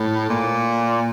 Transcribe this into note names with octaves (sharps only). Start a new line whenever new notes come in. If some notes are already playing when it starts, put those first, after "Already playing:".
Already playing: A2
A#2